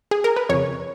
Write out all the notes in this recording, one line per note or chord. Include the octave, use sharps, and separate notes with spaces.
G#4
A#4
B4
F2 C#3 C#5